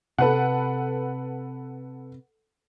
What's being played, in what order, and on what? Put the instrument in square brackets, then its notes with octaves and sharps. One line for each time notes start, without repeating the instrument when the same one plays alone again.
[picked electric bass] C3 [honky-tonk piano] A4 B4 F#5